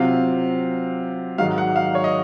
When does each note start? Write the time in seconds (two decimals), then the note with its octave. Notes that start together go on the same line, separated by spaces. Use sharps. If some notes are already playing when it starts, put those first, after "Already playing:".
Already playing: C3 F#3 C4 F4 F5
1.38 G#2 D#3 F#3 F5
1.58 F#5
1.76 F5
1.95 C#5
2.04 D#5